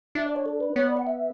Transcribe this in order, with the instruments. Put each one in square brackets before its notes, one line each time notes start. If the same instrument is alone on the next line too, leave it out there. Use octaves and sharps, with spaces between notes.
[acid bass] D4 [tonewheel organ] E5
[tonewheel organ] D5
C#5
A4
B4
[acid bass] B3 [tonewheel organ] C#5
[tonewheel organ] D5
F#5
E5